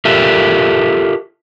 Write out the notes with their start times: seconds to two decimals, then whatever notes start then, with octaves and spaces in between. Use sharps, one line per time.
0.05 F4 G4 A4 A#4 E5